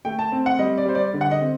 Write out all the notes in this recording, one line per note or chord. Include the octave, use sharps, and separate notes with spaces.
A3 G5
A5
C4
F#5
G3 D#5
D5
G3 C5
D5
D3
F#5
D#5
C4